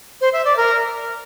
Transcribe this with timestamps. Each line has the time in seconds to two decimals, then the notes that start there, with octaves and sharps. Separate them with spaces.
0.21 C5
0.33 E5
0.45 D5
0.57 A#4